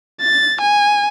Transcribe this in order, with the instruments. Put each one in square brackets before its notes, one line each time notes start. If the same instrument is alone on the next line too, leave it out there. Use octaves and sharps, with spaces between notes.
[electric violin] A6
G#5